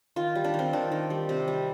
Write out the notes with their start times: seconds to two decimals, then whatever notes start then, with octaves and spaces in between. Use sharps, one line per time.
0.16 D#3 F4
0.35 G3
0.44 D4
0.54 D#3
0.59 C4
0.73 D#3 D4
0.92 D#3
1.10 G3
1.29 C3
1.48 G3